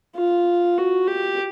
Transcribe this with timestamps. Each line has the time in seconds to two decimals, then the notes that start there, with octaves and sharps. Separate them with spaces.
0.16 F4
0.78 F#4
1.07 G4